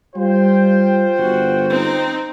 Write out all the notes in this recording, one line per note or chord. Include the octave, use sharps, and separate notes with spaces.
G3 F4 C5 G5
G1 F#4
C4 D#4